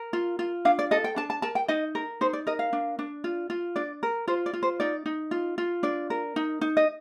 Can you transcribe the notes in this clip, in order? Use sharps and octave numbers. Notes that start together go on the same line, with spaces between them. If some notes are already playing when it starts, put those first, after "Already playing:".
Already playing: A#4
F4
F4
D4 F5
D5
A4 D#5
G5
D4 A5
A5
A#4 A5
G5
D#4 D#5
A#4
D#4 C5
D5
A#4 D#5
F5
D4
D4
F4
F4
D4 D5
A#4
F4 C5
D5
F4
C5
D#4 D5
D#4
F4
F4
D4 D5
A#4
D#4
D#4
D#5